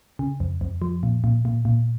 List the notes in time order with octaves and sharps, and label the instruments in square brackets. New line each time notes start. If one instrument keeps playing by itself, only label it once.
[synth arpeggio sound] C#3
F2
F2
F3
A#2
A#2
A#2
A#2